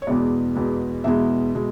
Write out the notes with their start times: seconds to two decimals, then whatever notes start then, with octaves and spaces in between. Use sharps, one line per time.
0.02 C#5
0.07 E2 B2 G#3 B3 D5
0.55 E2 B2 G#3 B3
1.04 E2 B2 G#3 B3 E5
1.55 B2 G#3